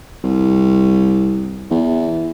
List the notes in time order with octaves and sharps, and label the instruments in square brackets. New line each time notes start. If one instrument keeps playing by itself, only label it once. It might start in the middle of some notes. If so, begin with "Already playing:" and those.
[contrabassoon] C2
E2